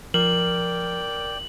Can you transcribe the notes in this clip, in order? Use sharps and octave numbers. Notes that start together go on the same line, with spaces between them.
F3 A#4 D5 G5 F#7